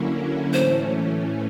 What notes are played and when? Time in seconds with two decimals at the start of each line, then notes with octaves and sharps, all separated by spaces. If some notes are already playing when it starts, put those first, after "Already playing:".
Already playing: D3 F#3 A#3 C#4 E4
0.53 A2 E3 A3 C#4 C5